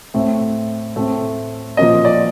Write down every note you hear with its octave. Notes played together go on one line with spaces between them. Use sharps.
A2 A3 C4
A2 A3 C4
A#2 F3 A#3 D#5
D5